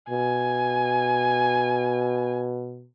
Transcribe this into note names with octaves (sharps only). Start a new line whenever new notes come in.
B2 G#5